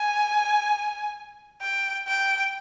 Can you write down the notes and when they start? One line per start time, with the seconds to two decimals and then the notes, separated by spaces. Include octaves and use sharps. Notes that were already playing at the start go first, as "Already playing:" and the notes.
Already playing: G#5
1.61 G5
2.07 G5